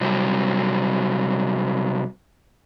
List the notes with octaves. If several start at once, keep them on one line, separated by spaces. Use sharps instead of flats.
C3 F#3 G3